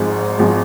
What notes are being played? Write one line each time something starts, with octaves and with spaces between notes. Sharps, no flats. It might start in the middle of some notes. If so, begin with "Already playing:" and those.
Already playing: G#1 G#2 F3 G#3
G#1 F3 G#3